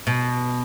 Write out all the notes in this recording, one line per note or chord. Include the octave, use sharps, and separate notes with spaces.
B2